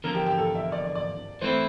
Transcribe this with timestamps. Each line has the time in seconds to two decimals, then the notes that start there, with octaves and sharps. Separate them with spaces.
0.04 E2 D3 F3 A#3 A#4
0.15 G4
0.26 G4
0.38 A4
0.55 E5
0.72 D5
0.84 D5
0.95 D5
1.41 E3 A3 C4 E4 C5